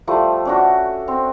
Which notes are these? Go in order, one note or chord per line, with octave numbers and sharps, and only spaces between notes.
F3 G3 A3
C#4 D4 F#4
C4